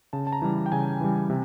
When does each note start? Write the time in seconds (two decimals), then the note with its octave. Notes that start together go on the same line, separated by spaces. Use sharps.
0.13 C#3 A5
0.27 A5
0.33 A#5
0.42 E3 G3
0.66 G5
0.72 C#3 G#5
1.01 E3 G3
1.30 C3